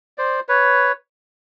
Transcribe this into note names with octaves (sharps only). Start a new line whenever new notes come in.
C5 D5
B4 C#5